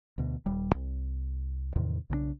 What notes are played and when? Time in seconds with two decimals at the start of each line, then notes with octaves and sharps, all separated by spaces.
0.18 D2 B2
0.46 D#1 G3
0.75 C2
1.76 E2 A2 C3 D#3
2.10 B1 C#3 G#3 D4